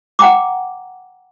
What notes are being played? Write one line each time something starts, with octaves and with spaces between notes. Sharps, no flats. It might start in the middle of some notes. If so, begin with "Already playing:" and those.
F#5 G5 A#5 D6